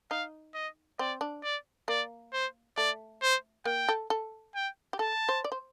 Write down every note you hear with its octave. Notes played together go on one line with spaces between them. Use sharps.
D#4 F5
D#5
C4 D5
D4
D5
A#3 D5
C5
A3 D5
C5
A#3 G5
A4
A4
G5
G4
A4 A5
C5
D5
C5